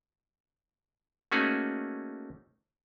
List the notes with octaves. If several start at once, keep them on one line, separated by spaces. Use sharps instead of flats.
A3 A#3 C#4 D#4 F#4 G#4